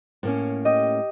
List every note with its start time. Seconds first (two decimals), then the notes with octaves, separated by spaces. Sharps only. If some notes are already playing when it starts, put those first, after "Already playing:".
0.23 A2 A#3 C#4
0.65 G4 D#5